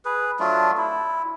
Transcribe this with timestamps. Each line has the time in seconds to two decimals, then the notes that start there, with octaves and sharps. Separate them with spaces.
0.05 G#4 B4
0.40 F#3 A3 D4 F4
0.77 E4